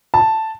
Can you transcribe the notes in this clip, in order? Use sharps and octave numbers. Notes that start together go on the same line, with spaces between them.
A5